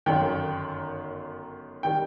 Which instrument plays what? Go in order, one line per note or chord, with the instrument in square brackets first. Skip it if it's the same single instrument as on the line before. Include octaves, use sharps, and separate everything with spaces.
[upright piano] G1 F#2 D#3 G5
D#3 G3 G5